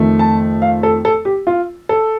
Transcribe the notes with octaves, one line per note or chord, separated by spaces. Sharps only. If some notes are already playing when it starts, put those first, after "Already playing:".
Already playing: F2 D#3 A3
A5
F5
A4
A4
G4
F4
A4